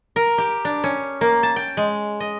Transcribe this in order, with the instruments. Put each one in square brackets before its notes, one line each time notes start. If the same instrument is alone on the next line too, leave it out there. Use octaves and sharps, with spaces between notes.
[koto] A#4
G4
D4
C#4
A#3
A5
G5
G#3
D#5